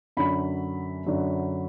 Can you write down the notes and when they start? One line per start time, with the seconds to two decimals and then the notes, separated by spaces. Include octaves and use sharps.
0.17 F#2 D3 F#3 B5
1.06 F#2 D3 F#3